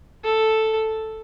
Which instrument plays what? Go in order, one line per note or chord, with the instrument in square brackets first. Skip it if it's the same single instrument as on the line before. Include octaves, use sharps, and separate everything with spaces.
[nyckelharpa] A4